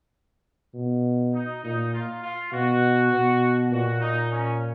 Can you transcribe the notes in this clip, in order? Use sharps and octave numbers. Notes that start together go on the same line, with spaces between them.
B2
D#4
A#2 D#4
F4
F4
B2 F#4
B2
A#2 F#4
D#4
C#4